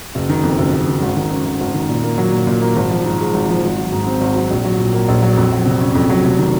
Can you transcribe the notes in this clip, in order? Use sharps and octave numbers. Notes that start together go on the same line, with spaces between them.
F#1
D#3
F2
F#1
F#1
D#3
G#1
D#3
F#2
G#1
G#1
D#3
A#2
A#3
F#3
A#2
A#2
A#3
G#1
F3
G#2
G#3
G#1
F3
G#1
F#3
G#2
C4
G#1
F#3
A#1
F#3
A#2
A#3
A#1
F#3
F2
F#3
C3
C#4
F2
F#3
F1
D#3